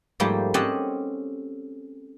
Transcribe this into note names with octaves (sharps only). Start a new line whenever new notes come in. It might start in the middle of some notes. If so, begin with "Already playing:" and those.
G#2 F3 G3 A3 A#3
C4 C#4 G4 D#5 F#5 A5